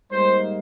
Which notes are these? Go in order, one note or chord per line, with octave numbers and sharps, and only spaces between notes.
G#2 G3 A#3 D#4 C5